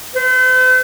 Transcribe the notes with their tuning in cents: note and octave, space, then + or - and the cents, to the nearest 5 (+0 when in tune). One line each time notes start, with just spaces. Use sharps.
C5 -45